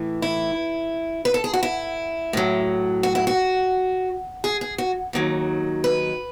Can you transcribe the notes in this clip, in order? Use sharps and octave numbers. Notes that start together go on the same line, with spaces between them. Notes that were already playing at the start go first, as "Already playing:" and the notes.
Already playing: A2 E3
E4
B4
A4
G#4
F#4
E4
A2 F#3
F#4
E4
F#4
G#4
G#4
F#4
D#2 D#3 F#3
B4